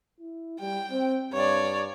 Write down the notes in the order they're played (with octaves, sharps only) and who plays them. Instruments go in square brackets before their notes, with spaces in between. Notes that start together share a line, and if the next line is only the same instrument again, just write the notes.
[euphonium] E4
[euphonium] G3 [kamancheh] G5
[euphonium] C4
[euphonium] G2 [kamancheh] C#5 D5